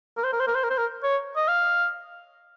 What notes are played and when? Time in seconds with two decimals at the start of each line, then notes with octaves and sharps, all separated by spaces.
0.17 A#4
0.24 C5
0.33 A#4
0.40 C5
0.47 A#4
0.54 C5
0.63 A#4
0.70 C5
0.78 A#4
1.03 C#5
1.36 D#5
1.48 F5